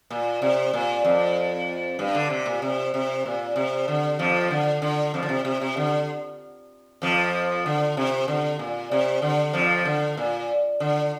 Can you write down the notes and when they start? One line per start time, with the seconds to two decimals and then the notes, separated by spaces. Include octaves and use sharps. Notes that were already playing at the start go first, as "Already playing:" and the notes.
0.10 A#2
0.42 C3
0.73 A#2
1.05 F2
1.99 G2
2.15 D3
2.30 C3
2.46 A#2
2.62 C3
2.94 C3
3.25 A#2
3.56 C3
3.88 D3
4.19 F2 F3
4.51 D3
4.82 D3
5.14 F2 F3
5.23 D3
5.29 C3
5.45 C3
5.61 C3
5.77 D3
7.02 F2 F3
7.66 D3
7.97 C3
8.28 D3
8.59 A#2
8.91 C3
9.22 D3
9.53 F2 F3
9.85 D3
10.17 A#2
10.80 D3